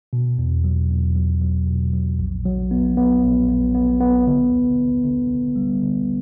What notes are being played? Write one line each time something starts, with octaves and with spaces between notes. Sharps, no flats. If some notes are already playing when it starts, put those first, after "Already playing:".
B2
E2
F#3
E2
F#3
F#3
B2
F#3
A#1
F#3
B3
B3
A#1
B3
B3
B3
D3
D2
D2
D3
D2
G3
D3